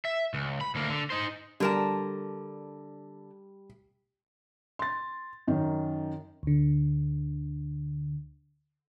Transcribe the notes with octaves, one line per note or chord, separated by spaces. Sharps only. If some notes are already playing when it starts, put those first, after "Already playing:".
E5
C#2
B5
D2 A#3
D3
D#4 C5
D3 G3 A#4 A5
C6 A6
F#2 D#3
D2 D3